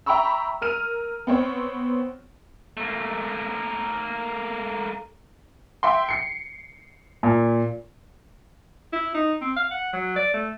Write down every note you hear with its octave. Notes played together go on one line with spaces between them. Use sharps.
E5 G5 A#5 B5 C#6 E6
A#4 F6 D#7
B3 C4 C#5
A3 A#3
E5 G5 C6
C7 C#7
A#2
E4
D#4
C4
F5
F#5
F#3
D5
A3